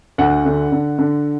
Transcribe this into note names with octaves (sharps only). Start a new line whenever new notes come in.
D2 F#5
D3
D3
D3